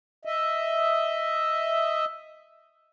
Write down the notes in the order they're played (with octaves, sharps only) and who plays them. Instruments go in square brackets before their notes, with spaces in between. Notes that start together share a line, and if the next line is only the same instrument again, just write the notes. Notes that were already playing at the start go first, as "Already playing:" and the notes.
[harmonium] D#5 E5